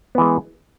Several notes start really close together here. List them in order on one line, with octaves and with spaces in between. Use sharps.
B3 E3 G#3